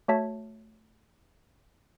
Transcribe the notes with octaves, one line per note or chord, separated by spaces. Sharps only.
A3 F#4 C#5 E5 A5 B6